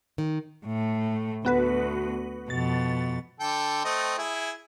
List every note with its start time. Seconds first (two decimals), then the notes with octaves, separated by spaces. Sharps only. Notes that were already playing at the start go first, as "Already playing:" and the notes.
0.18 D#3
0.65 A2 A3
1.45 D2 B3 F#4 B4
2.50 F2 B2 A6
3.40 D3 A4 G5
3.85 A3 C4 D#5
4.18 E4 G#4